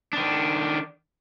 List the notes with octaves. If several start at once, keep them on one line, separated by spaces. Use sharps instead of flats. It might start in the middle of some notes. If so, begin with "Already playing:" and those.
D#3 D4